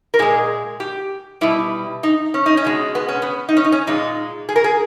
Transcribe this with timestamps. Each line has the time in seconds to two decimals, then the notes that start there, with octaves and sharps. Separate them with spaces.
0.14 A#4
0.19 A#2 G#3 G#4
0.80 G4
1.41 B2 G3 E4
2.03 D#4
2.34 C#4
2.46 D#4
2.57 C#4
2.65 B2 G#3
2.95 B3
3.08 C#4
3.22 B3
3.49 D#4
3.57 C#4
3.64 D#4
3.72 C#4
3.87 A#2 G#3 D#4
4.49 G#4
4.56 A#4
4.64 G#4